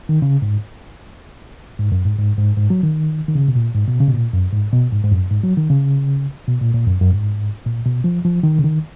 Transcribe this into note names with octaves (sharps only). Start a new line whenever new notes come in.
D#3
C#3
G#2
G#2
F#2
G#2
G#2
G#2
G#2
F#3
D#3
D#3
C#3
B2
A#2
G#2
B2
C#3
B2
A#2
F#2
G#2
B2
G#2
G#2
F#2
G#2
F#3
D#3
C#3
B2
A#2
A#2
F#2
F#2
G#2
A#2
B2
F3
F3
D#3
C#3
D#3